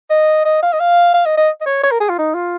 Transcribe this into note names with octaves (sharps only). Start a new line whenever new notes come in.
D#5
D#5
F5
D#5
F5
F5
D#5
D#5
D#5
C#5
C#5
A#4
G#4
F4
D#4
F4